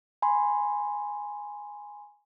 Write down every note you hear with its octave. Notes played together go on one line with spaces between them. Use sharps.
G#5 B5 C6